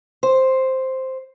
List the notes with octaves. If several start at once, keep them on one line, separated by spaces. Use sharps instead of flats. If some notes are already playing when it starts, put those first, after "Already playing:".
C5